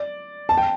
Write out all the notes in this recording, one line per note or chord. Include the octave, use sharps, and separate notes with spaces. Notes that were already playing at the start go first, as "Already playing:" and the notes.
Already playing: D5
A5
G5